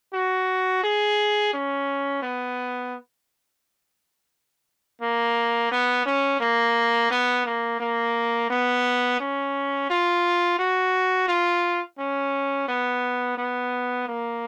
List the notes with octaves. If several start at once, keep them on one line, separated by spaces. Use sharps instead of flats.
F#4
G#4
C#4
B3
A#3
B3
C#4
A#3
B3
A#3
A#3
B3
C#4
F4
F#4
F4
C#4
B3
B3
A#3